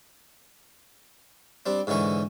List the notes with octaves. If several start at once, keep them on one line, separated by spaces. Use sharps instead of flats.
G3 C4 D4
G#2 D3 E3 C#4 C#6